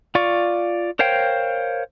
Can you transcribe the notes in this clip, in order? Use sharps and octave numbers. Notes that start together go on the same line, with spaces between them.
F4 D5 C#6
A#4 C5 C#5 F5 G5